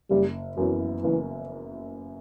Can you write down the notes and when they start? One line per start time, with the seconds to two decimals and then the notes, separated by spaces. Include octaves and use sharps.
0.10 F#1 G3
0.57 F#2 E3 F#3 B3
1.04 F#1 E3